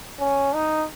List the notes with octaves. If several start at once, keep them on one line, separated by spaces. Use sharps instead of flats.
C#4
D#4